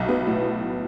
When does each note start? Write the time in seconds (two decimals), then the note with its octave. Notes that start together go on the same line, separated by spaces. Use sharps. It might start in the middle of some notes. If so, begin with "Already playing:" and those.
Already playing: B1 F#3 E5
0.09 B3
0.27 A2